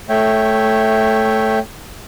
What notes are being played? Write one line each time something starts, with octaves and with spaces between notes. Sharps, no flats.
A3 C#5 E5 G5